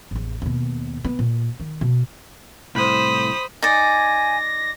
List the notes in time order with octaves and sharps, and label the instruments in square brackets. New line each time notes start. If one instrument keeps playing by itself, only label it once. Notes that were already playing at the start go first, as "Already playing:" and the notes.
[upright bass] A1 E2
D#2 B2
B3
A#2
D#3
B2
[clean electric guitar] C2 A2 [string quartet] C5 [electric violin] B5 D#6
[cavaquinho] D#4 D5 [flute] G#5 [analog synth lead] A#6